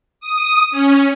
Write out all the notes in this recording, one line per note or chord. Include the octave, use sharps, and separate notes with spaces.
D#6
C#4